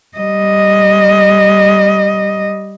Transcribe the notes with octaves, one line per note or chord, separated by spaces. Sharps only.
G3 D#5